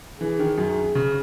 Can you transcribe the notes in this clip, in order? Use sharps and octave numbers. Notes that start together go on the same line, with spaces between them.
E3 G#4
D#3
F#2
C#3